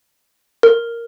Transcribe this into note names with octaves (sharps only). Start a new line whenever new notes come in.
A#4